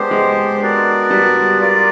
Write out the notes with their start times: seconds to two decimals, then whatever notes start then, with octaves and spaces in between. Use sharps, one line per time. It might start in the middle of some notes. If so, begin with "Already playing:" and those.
Already playing: G#3 B3 D4 G4 C5
0.11 G#3
0.61 B3 D4 F#4 A#4 D5
1.10 G3
1.61 F4 A#4 D5